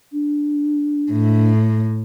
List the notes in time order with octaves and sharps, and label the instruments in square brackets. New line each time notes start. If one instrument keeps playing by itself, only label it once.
[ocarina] D4
[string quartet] A2